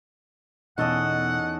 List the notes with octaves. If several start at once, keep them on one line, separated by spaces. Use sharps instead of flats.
E2 B2 C#4 D#4 A4 D#5 F#5